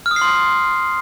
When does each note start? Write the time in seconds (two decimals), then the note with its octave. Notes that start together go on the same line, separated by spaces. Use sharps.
0.06 F6
0.11 D#6
0.16 C7
0.22 C6